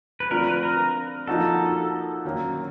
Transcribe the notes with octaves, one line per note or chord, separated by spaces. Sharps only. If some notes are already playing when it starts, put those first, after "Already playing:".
B4
D3 F3 A3 C4 F4 A#4
B4
A#4
F3 A#3 D#4 F#4 A4
D#3 F#3 A#3 C#4